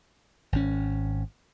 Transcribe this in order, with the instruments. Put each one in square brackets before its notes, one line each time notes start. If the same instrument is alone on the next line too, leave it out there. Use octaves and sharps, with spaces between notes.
[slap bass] G#1 C#4